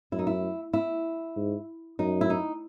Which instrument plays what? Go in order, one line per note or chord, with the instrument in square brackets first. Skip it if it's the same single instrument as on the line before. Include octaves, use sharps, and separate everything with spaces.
[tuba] F#2 [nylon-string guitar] E4
[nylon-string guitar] D#4
E4
E4
[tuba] G#2
[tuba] F#2 [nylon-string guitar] D#4
[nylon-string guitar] E4
D#4